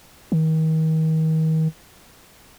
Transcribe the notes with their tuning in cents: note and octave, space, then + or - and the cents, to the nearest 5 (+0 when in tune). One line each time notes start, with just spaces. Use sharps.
D#3 +35